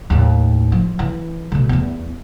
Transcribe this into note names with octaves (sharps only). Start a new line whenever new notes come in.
D#2 A2
F3
E3
B2 D3
E2 B3